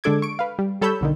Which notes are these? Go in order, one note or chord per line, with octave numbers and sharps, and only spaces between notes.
D3 G#3 D4 A4 D6 G#6
C#6 D7
B4 F5
G3
G3 A4 C#5 B5 E6 G6
B1 D3 D#3